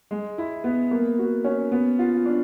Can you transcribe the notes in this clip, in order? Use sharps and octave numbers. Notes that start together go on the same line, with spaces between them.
G#3
E4
B3
A#3
F#4
C#4
B3
F4
D4